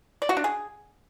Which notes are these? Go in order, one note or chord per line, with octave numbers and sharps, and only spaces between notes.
D5
F#4
D4
G#4